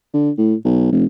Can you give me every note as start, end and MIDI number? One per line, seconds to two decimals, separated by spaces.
0.13 0.30 50
0.38 0.54 45
0.65 0.90 35
0.92 1.05 29